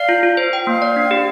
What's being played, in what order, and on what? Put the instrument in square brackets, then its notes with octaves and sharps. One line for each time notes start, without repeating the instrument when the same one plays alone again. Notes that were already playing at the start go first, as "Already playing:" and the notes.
Already playing: [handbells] D5 [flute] F5
[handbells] F4
F4
C5
G5
[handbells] A#3 [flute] F5
[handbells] D5
D4
G4